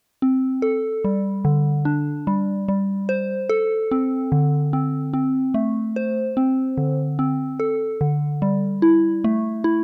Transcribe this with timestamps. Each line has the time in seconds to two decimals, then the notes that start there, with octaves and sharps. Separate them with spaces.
0.22 C4
0.62 A4
1.05 G3
1.45 D3
1.85 D4
2.27 G3
2.68 G3
3.09 C5
3.49 A4
3.91 C4
4.32 D3
4.73 C4
5.14 C4
5.54 A3
5.96 C5
6.37 C4
6.78 D3
7.19 C4
7.60 A4
8.01 D3
8.42 G3
8.82 E4
9.24 A3
9.64 E4